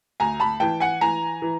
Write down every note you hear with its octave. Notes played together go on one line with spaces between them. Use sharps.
D2 G#5 A#5
A5 B5
E3 G5 A5
F#5 G#5
E3 G#5 A#5
E3